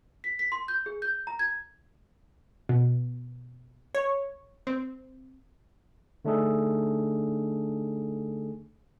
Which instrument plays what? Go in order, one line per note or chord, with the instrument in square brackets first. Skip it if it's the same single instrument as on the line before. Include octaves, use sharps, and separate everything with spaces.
[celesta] B6
B6
C6
G6
G#4
G6
A#5
G#6
[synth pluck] B2
C#5
C4
[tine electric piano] D3 A3 D4 D#4 G#4 A4